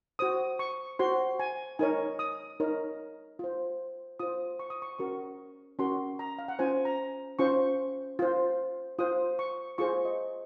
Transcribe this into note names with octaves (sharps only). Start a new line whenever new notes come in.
F#4 C5 D#6
C#6
F#4 C5 C6
G#5
D#4 A#4 C#5 G#5
D#6
D#4 A#4 C#5
F4 C5
F4 C5 D#6
C#6
D#6
C#6
C#4 F#4 A#4 C#6
C#4 F#4 A#4 C6
A#5
F5
F#5
C#4 F4 C5 G#5
A#5
C#4 F4 C5 C#6
F4 C5
F4 C5 D#6
C#6
F4 G#4 C5 C#6
D#5